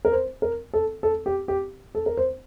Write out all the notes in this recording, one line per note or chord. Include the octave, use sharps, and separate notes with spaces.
A#4
C5
A#4
A4
A4
G4
G4
A4
A#4
C5